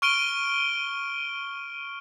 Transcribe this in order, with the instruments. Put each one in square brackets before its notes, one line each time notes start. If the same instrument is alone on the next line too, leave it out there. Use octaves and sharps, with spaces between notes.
[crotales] C#6 F6 D7 D#7 G7